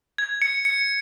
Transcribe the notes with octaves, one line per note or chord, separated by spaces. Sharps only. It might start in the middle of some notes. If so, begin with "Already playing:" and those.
G#6
C#7
C#7